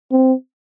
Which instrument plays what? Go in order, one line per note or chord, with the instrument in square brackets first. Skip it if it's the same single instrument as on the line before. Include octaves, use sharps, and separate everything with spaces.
[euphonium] C4